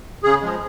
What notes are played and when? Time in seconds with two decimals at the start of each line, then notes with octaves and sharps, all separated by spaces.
0.24 C#3 G#4
0.41 F3 G#3